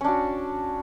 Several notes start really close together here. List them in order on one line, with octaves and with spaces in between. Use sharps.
C#4 D4 F#4